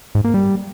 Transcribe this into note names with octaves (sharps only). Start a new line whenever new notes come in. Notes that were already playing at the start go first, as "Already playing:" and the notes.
G#2
A#3
G3